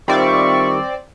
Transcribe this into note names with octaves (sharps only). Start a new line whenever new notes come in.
D#3 G3 C4 F4 D5 E5 C#6